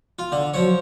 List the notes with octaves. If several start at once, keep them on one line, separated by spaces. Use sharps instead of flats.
F4
D3
F3 F#3 C#5